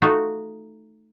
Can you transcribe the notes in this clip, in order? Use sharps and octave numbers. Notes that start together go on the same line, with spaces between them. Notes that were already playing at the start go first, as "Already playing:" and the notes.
A3 D#4 F4 F#4